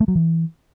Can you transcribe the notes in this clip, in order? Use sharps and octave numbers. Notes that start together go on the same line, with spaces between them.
A3
F#3
E3